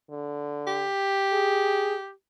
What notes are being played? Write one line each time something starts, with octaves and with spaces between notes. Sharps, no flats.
D3
G4
G#4